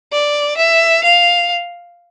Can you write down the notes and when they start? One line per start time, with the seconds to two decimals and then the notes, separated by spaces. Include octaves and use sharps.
0.12 D5
0.57 E5
1.03 F5